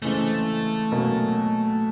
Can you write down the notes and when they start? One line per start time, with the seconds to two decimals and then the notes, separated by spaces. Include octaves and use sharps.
0.02 C#3 E3 G#3 A3 C4
0.92 B2 F#3 A#3 C#4